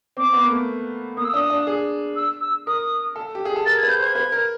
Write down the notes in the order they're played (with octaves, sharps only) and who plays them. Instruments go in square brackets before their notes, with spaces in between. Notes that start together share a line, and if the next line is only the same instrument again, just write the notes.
[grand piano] C4 [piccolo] D6
[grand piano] B3
A#3
A3
[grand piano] A#3 [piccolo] D#6
[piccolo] E6
[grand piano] D4 [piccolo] D#6
[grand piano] D4
G#4
[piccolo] E6
E6
[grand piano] A#4 [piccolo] D#6
[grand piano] A4
G4
G#4
A4
[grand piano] A#4 [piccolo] A6
[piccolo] G#6
[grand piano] B4
[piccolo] G6
[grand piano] C5 [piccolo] G#6
[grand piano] B4
A#4